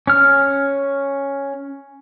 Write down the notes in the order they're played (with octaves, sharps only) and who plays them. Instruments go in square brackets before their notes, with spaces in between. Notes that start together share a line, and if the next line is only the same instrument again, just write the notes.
[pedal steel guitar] C#4 F6